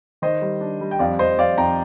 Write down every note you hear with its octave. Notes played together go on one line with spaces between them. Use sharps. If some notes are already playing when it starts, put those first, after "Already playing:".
D#3 C5 D#5
G3
D4
G3
G5
F2 D5 F5
F2 C5 D#5
F2 D5 F5
F2 G5 A#5